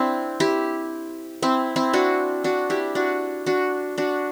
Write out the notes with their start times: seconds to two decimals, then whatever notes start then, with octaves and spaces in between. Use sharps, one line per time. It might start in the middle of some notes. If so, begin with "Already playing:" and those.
Already playing: C4 D4 E4
0.40 E4 G4
1.42 C4 E4
1.76 C4 E4
1.93 D4 F#4
2.44 D4 F#4
2.70 E4 G4
2.95 D4 F#4
3.46 D4 F#4
3.98 D4 F#4